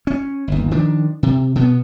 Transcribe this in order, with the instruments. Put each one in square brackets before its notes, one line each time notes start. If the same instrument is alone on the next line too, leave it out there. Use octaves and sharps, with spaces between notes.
[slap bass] C#4
G1 D#2
D#3 F3 D4
C3
B2 B3